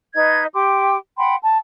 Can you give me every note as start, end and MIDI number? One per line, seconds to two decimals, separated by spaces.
0.14 0.44 63
0.14 0.44 71
0.14 0.44 75
0.14 0.44 92
0.53 0.96 67
0.53 0.96 79
0.53 0.96 84
0.53 0.96 86
1.17 1.35 78
1.17 1.35 79
1.17 1.35 83
1.17 1.35 84
1.42 1.58 81